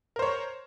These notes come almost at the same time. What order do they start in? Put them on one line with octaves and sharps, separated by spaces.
A#4 C5 C#5